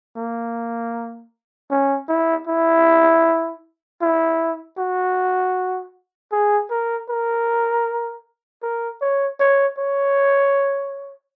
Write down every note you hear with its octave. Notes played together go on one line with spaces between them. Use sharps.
A#3
C#4
E4
E4
E4
F#4
G#4
A#4
A#4
A#4
C#5
C#5
C#5